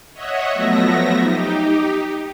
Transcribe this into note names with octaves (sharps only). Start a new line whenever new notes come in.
C#5 D#5 E5 F#5
F3 F#3 A3 B3 E5 A#6
D#4 G4